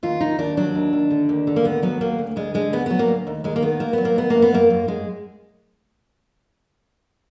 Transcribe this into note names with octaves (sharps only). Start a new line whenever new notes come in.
D#2 F4
D#2 D#4
D#2 D4
F#3 D4
D#2
D#2
D3
D#2
D3
A#3
D#2 B3
F#3 B3
D#2 A#3
D2
D2 G#3
D3 G#3
D2 B3
F#3 B3
A#3
D2
D#2
D#2 G#3
A#3
D#3 B3
D#2 A#3
F#3 B3
A#3
D#2 B3
F#2 A#3
B3
F#2 A#3
F#2
F#2 G#3